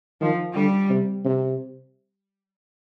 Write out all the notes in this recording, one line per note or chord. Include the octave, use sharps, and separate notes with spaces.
D#3 F3
D3 G3
C3
C3